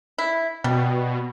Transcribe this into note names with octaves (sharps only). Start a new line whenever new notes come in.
E4
B2 G3